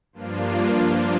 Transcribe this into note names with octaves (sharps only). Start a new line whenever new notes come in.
G2 F3 A#3 D4 F4